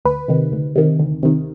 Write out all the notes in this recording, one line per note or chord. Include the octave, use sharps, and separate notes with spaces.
D2 B4
C3 D#3
D2
C3 D#3
D2
C3 D#3